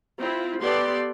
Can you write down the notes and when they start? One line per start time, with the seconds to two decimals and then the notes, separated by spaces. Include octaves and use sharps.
0.19 C4 E4 F4
0.62 B3 G4 A4 D5 C6